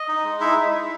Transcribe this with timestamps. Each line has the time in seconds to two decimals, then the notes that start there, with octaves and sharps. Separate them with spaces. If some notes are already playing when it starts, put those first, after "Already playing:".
Already playing: D#5
0.08 D#4
0.24 G#3
0.40 D#4 E4 E5
0.56 G#3
0.73 D#4